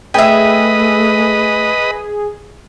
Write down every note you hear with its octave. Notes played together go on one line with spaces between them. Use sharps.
A3 G#4 B4 D#5 E5 G5